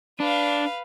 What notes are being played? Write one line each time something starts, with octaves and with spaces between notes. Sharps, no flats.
D4 B4 F5